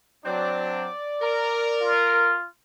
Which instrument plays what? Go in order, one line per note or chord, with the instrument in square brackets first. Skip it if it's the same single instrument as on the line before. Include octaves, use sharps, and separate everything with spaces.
[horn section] F#3 C4 D4 [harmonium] D5
[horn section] A#4
[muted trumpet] F4